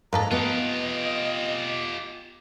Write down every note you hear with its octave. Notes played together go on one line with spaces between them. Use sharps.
G#2 A#3 D#4 A4 A#5
B3 F4 G4 D#5